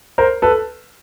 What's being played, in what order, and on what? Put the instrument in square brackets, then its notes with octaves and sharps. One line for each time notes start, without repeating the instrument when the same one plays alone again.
[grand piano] A#4 C5
A4 B4